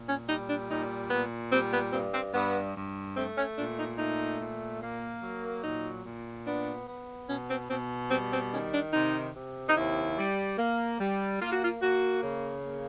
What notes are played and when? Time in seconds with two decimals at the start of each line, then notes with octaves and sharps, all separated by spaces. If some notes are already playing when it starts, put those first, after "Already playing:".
Already playing: A#2
0.08 C#4
0.28 G3 D#4
0.49 D4
0.70 A#2 D#4
1.10 A#2 B3
1.52 G3 C4
1.72 B3
1.93 G2 C4
2.14 C4
2.34 G2 B3
2.76 G2
3.16 A3 C4
3.37 C#4
3.58 A#2 D4
3.78 D#4
3.99 A3 D#4
4.41 A#2
4.82 A#3
5.23 F#3
5.64 A#2 D#4
6.05 A#2
6.47 B3 D4
6.87 B3
7.29 B2 C#4
7.50 C4
7.70 B2 C4
8.11 G3 C4
8.32 C4
8.53 D#3 C#4
8.73 D4
8.93 C3 D#4
9.34 C3
9.69 D#4
9.76 D#2 E4
10.18 G3
10.58 A#3
11.00 G3
11.41 A#3 F4
11.52 F#4
11.64 F4
11.82 A#3 F#4
12.23 C#3
12.65 A#3